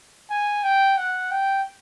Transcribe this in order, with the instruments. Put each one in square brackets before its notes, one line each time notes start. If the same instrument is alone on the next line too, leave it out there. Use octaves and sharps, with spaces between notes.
[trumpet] G#5
G5
F#5
G5